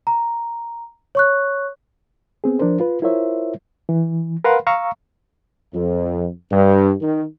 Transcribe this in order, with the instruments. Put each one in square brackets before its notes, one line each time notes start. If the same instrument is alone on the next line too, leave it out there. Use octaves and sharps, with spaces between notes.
[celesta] A#5
C#5 C#6 F#6
[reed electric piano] B3 C4 G#4
F3 D4 A#4 C5
F4 B4
E4 F4 A#4 C5 C#5 E5
E3
A#4 B4 F5 F#5 B5 C6
F5 A#5 C#6 E6
[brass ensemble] F2
G2
D#3